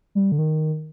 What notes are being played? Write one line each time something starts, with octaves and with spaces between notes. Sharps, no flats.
G3
D3
D#3